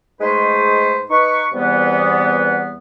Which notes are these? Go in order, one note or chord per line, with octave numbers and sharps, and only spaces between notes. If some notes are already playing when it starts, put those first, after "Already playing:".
G#2 G#3 A3 D#4 B4 C5
D#4 B4 C#6
E2 C3 E3 G3 B3